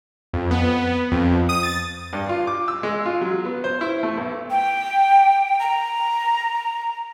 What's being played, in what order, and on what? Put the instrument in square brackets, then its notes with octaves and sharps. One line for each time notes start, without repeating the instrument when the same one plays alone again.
[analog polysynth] F2
B3
F2
D#6
A6
[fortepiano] G2
F4
D6
E6
G#3
F4
F#3
B3
C5
E4
A3
B1
[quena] G5
A#5